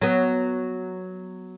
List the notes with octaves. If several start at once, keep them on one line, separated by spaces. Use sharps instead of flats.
F#3 B3